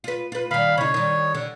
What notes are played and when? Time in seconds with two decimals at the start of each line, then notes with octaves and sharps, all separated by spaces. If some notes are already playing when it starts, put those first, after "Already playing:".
0.04 F4 B4
0.32 F4 B4
0.51 D#3 G3 F5 B5
0.78 C#3 D#4 C#5
0.94 D#3 G3
1.34 D3